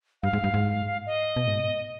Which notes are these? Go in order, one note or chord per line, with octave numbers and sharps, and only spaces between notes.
G2 F5
G#2
G2
G#2
D#5
B2
G#2